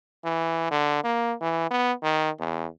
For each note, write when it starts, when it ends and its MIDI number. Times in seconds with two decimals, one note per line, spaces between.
0.24 0.68 52
0.71 1.01 50
1.04 1.34 58
1.41 1.66 52
1.70 1.92 59
2.02 2.30 51
2.39 2.67 40